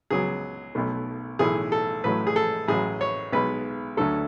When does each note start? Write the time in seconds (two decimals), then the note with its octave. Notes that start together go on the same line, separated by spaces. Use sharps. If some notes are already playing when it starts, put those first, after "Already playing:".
0.10 C#2 C#3 F#3 B3 G#4
0.75 B1 B2 A3
1.39 B1 A2 E3 A3 G#4
1.72 A4
2.04 A1 A2 F#3 A3 B4
2.27 G#4
2.36 A4
2.68 A1 A2 F#3 G#4
3.01 C#5
3.32 B1 B2 G#3 B4
3.97 D2 D3 F#3 A3 A4